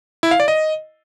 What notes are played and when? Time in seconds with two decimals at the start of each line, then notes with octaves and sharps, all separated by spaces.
0.23 E4
0.31 F5
0.40 D5
0.48 D#5